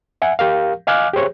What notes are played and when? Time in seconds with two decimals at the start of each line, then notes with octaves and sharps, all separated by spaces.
0.22 E5 F#5 G#5
0.39 G4 A#4 F5
0.87 D#5 F5 G#5 D6 F6 F#6
1.13 G4 G#4 C5 C#5